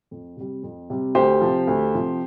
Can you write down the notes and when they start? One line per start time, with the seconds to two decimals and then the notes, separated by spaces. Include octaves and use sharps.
0.11 F2
0.37 C3 G3
0.63 F2
0.90 C3 G3
1.15 D2 G4 C5
1.41 C3 F3
1.67 D2
1.94 C3 F3